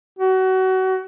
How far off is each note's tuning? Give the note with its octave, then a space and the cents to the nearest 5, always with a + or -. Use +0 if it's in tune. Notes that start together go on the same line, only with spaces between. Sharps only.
F#4 +30